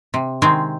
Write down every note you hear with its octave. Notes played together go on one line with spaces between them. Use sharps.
C3
D#3 G#3 C4